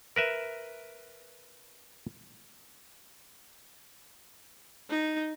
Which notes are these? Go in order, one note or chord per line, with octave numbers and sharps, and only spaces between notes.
A#4 B4 E5
D#4